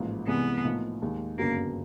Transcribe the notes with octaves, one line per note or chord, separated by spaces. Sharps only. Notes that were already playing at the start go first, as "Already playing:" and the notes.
Already playing: A1 G#2 F3 A#3
C2 C3 E3 G#3 B3
A2 F3 A#3 D#4
D#2 D#3 G#3
G1 F#2 C#3 F#3 A#3 B3